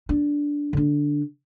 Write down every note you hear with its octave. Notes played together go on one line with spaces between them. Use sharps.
D4
D3 D4